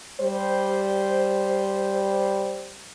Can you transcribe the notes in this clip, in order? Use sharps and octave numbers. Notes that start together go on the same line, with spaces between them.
G3 C5